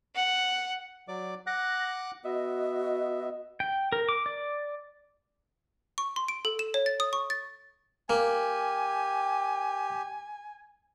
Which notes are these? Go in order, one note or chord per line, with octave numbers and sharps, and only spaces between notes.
F#5
F#3 D5 D6
F#5 D6 F#6 A#6
B3 F#4 D#5 E5
G5
A#4
D6
D5
C#6
C6
D7
A4
E7
C#5
A6
D#6
C#6
A6
A#3 G4 G#5